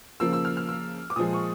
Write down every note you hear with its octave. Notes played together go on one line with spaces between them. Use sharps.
C#3 F3 A#3 E6
E6
F6
F6
E6
D6
A#2 F3 G#3 D#6
C#6